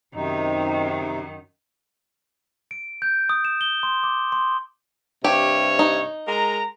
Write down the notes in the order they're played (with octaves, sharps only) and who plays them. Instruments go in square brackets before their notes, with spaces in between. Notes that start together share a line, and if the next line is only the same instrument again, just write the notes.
[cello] F#2 D#3 [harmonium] C3 D#4
[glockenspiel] D7
G6
D#6
E7
G7
C6
D6
C6
[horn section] G2 C3 C#5 [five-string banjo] G4
[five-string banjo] D#4
[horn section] G#3 A#4 A#5